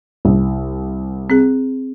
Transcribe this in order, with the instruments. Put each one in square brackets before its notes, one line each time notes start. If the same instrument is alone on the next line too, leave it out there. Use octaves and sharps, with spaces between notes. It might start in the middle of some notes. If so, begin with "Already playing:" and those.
[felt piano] C2
[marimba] C4 G#4